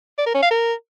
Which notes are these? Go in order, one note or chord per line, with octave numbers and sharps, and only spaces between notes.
D5
A#4
C#4
F5
A#4